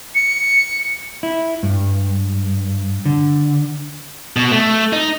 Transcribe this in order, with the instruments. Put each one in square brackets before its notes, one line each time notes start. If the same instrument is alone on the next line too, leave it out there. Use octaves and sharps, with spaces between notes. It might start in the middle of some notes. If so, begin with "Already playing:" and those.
[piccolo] C#7
[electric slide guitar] E4
G2
D3
[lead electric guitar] B2
A3
D#4